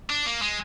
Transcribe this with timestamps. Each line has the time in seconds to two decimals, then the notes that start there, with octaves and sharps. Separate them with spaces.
0.10 D4
0.26 A#3
0.42 G#3